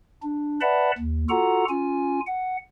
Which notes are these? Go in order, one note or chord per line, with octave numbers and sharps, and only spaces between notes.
D4
B4 D5 E5 F#5 A5 B5
D#2
F4 F#4 A4 F#5 A#5
C#4 F4 G#5
F#5